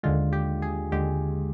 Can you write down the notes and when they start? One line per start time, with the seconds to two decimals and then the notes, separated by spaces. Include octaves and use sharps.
0.03 D#2 D3 G#3 F4
0.33 G4
0.62 G#4
0.92 D#2 D3 G#3 G4